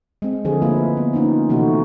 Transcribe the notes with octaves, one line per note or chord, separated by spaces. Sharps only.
G#3 C4
D3 F3 G#4
A3 A#3 E4 F4 B4
B3
A#3 C#4 D#4 F4
C3 E3 A3 D#4 F#4